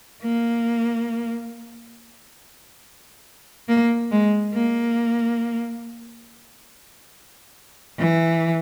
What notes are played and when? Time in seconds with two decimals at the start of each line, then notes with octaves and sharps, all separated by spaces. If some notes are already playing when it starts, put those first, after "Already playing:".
0.23 A#3
3.68 A#3
4.12 G#3
4.54 A#3
7.99 E3